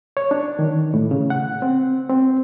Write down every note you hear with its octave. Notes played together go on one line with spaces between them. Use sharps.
C#5
D4
D#3
A2
C#3
F#5
C4
C4